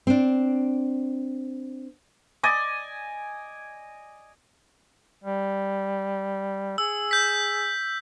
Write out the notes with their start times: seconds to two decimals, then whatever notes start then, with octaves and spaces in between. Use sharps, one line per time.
0.07 C4 D4
2.43 D5 D#5 G#5
5.24 G3
6.78 G#4 E6
7.11 G6 B6